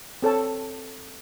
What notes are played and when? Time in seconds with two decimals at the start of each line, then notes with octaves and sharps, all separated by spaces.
0.22 C4 A4 C#5 A5